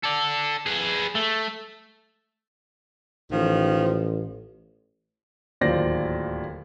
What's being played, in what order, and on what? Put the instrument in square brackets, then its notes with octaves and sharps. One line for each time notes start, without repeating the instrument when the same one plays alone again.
[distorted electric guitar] A4 D5
G#4 B4
A3
[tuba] A1 [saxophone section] D#3 F3
[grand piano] D1 D#2 F4 C5 D5 A#6